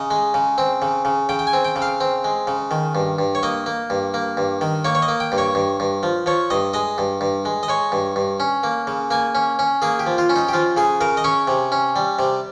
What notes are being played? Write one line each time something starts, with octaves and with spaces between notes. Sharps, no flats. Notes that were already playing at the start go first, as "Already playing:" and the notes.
Already playing: C#3 D#5
G#3
C#3
C4
C#3
C#3
C#3 G5
G5
G#5
C4
G5
C#3
F5
C4
G#3
C#3
D#3
G2
G2
C#5
A#3 D#5
A#3
G2
A#3
G2
D#3
A#3 C#5
C#5
D#5
A#3
G5
G2
C#5
G2
G2
F3
F3 C#5
G2 D#5
G#3 D#5
G2
G2
G#3
D#5
G#3 C#5
G2
G2
C#4
A#3
C#3
A#3 G#5
C#4
C#4
A#3 G#4
G4
F3
F4
C#4
D#4
G4
F3 F4
C#3 G#4
C#3 A#4
D#5
C#4 C#5
C3
C#4
G3
C3